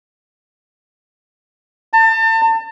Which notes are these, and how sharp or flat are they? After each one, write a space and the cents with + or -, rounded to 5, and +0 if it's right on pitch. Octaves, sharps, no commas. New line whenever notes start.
A5 +35